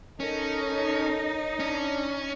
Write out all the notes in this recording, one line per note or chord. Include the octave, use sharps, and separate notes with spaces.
C#4 D#4 A4 A#4 C#5
C#4 D4